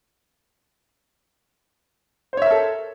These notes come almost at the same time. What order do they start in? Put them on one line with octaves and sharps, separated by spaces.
C5 C#5 E5 A#4 A4